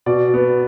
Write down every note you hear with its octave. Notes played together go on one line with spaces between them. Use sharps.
B2 D5
B3